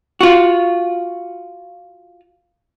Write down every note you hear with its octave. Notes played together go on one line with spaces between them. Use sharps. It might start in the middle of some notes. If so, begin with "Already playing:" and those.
F4 F#4